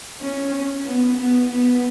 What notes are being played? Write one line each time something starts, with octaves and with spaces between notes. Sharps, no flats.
C#4
B3
B3
B3